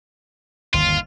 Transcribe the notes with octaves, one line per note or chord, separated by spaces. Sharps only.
G1 D#2 D#3 F4